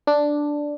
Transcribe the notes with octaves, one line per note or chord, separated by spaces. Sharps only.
D4